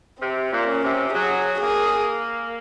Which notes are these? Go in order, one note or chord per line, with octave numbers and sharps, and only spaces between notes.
C3 C4
A#2
C#4
C3
F#3 G#4
A#3 G#4